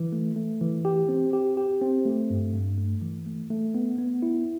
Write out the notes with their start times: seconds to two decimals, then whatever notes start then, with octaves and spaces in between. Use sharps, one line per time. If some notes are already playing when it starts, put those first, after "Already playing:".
Already playing: E3
0.12 A3
0.36 A3
0.61 E3
0.85 G4
1.09 C4
1.33 G4
1.57 G4
1.81 C4
2.05 A3
2.30 G2
2.54 G2
2.78 A3
3.02 E3
3.26 A3
3.50 A3
3.74 B3
3.98 B3
4.22 E4